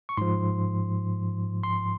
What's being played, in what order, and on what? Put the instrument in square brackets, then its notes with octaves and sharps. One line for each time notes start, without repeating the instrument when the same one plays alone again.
[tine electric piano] C#6
G#2 F3 C6
C6